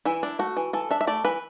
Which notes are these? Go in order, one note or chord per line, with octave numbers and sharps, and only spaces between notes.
E3 E4
D4
A3 F#4
E3
E3 A4
D4 E5
E5
A3 D5
E3 B4